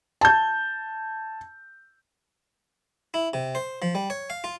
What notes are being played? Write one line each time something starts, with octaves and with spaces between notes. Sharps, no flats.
A5 G6
E4
C3
C5
F3
G3
C#5
F5
F4